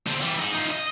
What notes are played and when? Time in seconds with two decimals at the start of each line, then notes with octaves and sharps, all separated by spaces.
0.07 D3 C4
0.21 E3 G3
0.39 D#4 G#4
0.54 D#4 F4
0.71 D#5